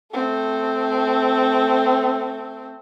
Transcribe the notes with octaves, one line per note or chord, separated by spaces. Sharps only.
A3 C4